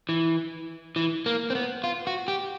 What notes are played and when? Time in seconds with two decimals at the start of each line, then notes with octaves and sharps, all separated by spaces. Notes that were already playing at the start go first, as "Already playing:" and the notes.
0.09 E3
0.96 E3
1.26 A#3
1.50 C4
1.55 B3
1.84 F4
2.07 F#4
2.28 G4